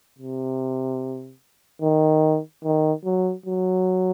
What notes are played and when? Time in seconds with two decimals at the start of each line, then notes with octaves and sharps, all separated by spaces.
0.19 C3
1.82 D#3
2.64 D#3
3.05 F#3
3.46 F#3